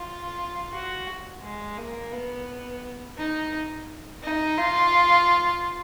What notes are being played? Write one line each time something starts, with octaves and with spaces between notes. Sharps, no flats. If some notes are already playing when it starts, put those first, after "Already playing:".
Already playing: F4
F#4
G#3
A#3
B3
D#4
D#4
F4